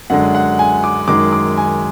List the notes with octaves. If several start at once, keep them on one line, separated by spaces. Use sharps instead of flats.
F#2 D3 G#3 F#5
F#5
G#5
D6
F#2 D#3 G#3 D6
D6
G#5